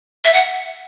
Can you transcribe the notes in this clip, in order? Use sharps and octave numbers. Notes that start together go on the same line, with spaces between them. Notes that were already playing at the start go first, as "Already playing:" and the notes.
E5
F#5